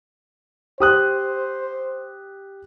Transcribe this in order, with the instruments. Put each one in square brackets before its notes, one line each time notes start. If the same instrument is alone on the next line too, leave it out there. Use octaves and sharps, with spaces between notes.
[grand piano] G4 D#6 F#6 [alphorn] C5